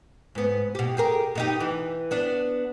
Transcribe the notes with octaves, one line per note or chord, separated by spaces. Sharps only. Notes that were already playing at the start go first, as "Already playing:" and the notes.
G#2 B3
B2 G4
G4 G#4 A#4
B2 D#4 G4
E3
B3 D4